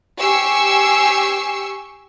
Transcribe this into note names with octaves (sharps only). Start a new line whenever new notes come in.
G4 G#5 C#6 E6 C7